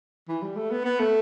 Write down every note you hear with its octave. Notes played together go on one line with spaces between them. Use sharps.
E3
G3
A3
B3
B3
A3